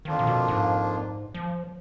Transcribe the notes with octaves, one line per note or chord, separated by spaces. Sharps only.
F2 D#3 F3 A#3 D4 F4
A#2
B2
G#2
F3